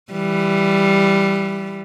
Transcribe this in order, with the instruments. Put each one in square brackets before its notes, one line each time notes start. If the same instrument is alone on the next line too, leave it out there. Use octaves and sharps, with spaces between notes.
[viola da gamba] E3 G3